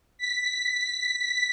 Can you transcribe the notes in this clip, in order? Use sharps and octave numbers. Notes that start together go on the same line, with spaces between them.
B6